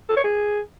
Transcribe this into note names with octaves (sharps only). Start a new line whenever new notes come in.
A4
C#5
G#4